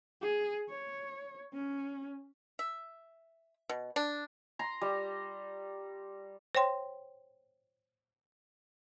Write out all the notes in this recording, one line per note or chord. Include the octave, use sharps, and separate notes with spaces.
G#4
C#5
C#4
E5
B2
D4
A#5 C6
G3
C5 C#5 G5 C6